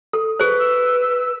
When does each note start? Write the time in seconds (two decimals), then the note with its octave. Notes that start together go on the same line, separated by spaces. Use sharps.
0.13 A4
0.40 G#4 B4 C5
0.59 E6